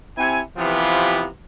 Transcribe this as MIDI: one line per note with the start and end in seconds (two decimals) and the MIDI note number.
0.17 0.42 48
0.17 0.42 60
0.17 0.42 64
0.17 0.42 80
0.57 1.27 48
0.57 1.27 52
0.57 1.27 53
0.57 1.27 59
0.57 1.27 65
0.57 1.27 67